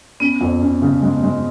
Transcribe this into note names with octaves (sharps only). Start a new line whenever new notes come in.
B3 C#4
F2
C#4
C#3
G#3
G#3